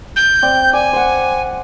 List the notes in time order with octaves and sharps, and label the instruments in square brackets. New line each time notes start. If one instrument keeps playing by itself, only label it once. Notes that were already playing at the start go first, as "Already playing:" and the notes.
[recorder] G6
[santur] C4 D5
[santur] D5 [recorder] G#5
[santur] C5 F#5